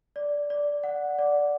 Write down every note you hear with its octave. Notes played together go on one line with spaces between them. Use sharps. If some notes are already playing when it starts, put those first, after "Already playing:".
D5
D5
F#5
D5